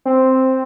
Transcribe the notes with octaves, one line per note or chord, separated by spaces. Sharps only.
C4